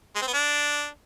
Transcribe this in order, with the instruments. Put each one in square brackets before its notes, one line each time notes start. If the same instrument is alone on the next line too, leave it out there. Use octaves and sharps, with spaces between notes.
[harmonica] G#3
C4
B3
D4